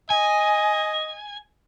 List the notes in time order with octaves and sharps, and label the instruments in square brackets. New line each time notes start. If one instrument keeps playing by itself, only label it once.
[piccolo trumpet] D#5 [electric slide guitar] G#5